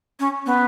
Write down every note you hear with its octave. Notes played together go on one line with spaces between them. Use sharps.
C#4
B3